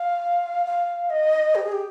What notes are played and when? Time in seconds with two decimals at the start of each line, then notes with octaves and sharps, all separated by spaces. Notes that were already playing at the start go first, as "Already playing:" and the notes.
Already playing: F5
0.66 F5
1.10 D#5
1.55 G4
1.64 G#4
1.72 G4